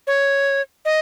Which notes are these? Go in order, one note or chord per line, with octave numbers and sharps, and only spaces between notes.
C#5
D#5